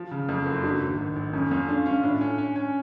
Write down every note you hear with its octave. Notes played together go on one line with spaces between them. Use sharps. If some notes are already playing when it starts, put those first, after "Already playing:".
Already playing: F3
C#3
F2
F#1
F#3 D4
G#1
G#1
G#1
F2 C#4
F2 C#4
D4 F4
C#4 F4
A2 D4
C#4
C#4
C#4